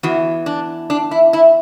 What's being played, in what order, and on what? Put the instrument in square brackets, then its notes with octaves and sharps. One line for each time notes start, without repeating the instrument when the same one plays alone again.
[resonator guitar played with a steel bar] E2 E3 F#4
D4
D4
E4
E4